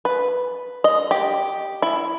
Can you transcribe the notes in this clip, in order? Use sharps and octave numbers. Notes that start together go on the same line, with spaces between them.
B4
D#5
G4
E4